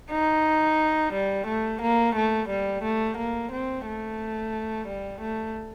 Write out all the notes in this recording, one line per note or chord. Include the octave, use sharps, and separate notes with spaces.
D#4
G3
A3
A#3
A3
G3
A3
A#3
C4
A3
G3
A3